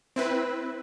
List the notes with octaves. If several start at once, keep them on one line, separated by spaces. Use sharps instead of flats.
C4 E4 B4